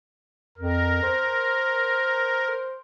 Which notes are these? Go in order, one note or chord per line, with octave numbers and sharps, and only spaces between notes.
F2 A#4
C5